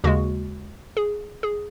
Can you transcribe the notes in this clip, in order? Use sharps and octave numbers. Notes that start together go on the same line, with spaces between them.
D#2 C#3 G#3 F#4
G#4
G#4